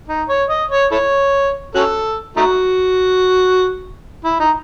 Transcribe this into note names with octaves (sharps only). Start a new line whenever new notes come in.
D#4
C#5
D#5
C#5
E4 A4 C#5
C#4 F#4 A4
A3 D#4 F#4
E4
D#4